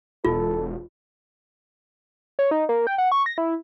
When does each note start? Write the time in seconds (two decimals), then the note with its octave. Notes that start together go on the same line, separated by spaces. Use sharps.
0.25 E1 F4 A4
2.39 C#5
2.51 D#4
2.69 A#3
2.87 G5
2.98 F#5
3.12 C#6
3.26 A#6
3.38 E4